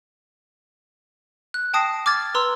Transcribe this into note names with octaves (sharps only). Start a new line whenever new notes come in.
F#6
G5 A5 D#6 A#6 C7
D6 F6 G#6 A6
B4 A#5 C6 E6